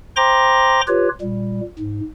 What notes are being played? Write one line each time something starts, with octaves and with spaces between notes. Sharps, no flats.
C5 G5 A#5 C6 D6 A#6
F4 G4 B4 C#5
A#2 G3
G#2